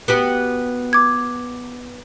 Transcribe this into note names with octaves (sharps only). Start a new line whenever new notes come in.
B3 F#4 G4
D6 G#6